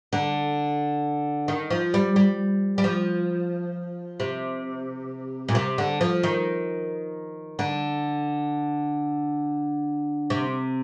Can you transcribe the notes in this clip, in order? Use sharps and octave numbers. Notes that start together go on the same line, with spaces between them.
D3
D#3
F3
G3
G3
G3
F3
C3
A#2
C3
D3
F3
D#3
D3
C3